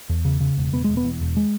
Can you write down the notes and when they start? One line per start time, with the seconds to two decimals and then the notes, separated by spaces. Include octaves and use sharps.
0.09 E2
0.25 C#3
0.41 C#3
0.57 E1
0.73 E1 B3
0.84 E1 G#3
0.97 B3
1.04 E2
1.21 E1
1.37 G#3